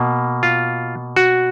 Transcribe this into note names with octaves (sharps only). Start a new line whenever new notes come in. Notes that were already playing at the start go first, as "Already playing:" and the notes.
Already playing: B2 A#3
F4
F#4